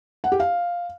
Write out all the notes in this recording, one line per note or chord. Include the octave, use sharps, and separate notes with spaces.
F#5
G4
F5